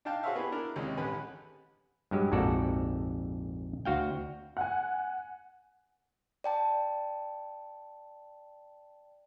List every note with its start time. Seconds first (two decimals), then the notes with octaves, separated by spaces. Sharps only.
0.05 D4 D#4 F5 G5 A5
0.23 F#4 G#4 C5 C#5 E5 F5
0.35 B3 E4 G4 G#4 B4
0.52 D4 E4 A#4
0.76 D#2 C3 G#3 C#4
0.97 A1 D3 G4 B4 G#5 B5
2.11 G2 F#3 G#3 G4
2.32 A#1 F2 G#2 F#4 A4 D5
3.85 D2 F#4 F5 G5
4.57 F#5 G#5
6.44 D5 G5 A5